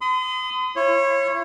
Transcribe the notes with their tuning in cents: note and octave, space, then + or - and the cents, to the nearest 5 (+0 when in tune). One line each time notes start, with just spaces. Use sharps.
C6 -45 D#6 +0
E4 +45 C#5 -20